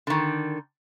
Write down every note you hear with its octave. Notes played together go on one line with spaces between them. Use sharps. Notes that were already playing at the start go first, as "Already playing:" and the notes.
D3 D#3